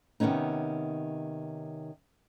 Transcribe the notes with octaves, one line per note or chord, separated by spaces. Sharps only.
C3 D#3 A#3 B3 C#4 D#4